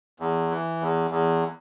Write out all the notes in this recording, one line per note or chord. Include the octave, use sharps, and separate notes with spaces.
E2
E3
E2
E2